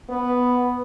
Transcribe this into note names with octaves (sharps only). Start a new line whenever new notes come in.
B3